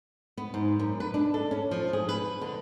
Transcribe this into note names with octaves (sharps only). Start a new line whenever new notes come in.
B3
G#2
F#2
B4
D4
A4
C#4
F3
G#4
B4
D3